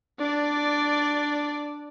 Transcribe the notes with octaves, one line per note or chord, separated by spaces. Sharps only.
D4 D5